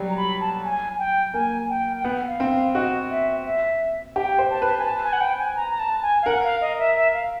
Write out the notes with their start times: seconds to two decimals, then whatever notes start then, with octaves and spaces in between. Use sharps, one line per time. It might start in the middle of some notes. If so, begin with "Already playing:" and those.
Already playing: F#3 G3
0.10 A#5
0.17 B5
0.41 A5
0.64 G#5
0.99 G5
1.34 A#3 G#5
1.69 G5
1.96 G5
2.04 B3 F#5
2.27 F5
2.40 C4
2.51 F5
2.74 F#4 D#5
3.10 E5
3.45 E5
4.16 G4 G5
4.39 C5
4.50 A5
4.62 B4
4.78 G#5
4.85 A5
5.04 G#5
5.13 F#5
5.21 G5
5.38 G#5
5.56 A#5
5.71 A#5
5.79 A5
6.02 G#5
6.22 F5
6.26 A#4 F#5
6.44 F5
6.61 D#5
6.79 E5
6.96 E5
7.14 F5